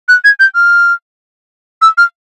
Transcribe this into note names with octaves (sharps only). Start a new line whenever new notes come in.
F#6
G#6
G6
F6
E6
F6